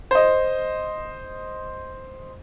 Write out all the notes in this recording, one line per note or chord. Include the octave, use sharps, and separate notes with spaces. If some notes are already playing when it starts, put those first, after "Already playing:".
C5 D#5